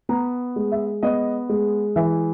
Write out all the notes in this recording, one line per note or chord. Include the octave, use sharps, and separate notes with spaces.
B3 A#5
G#3
E5
B3 D#5
G#3
E3 E5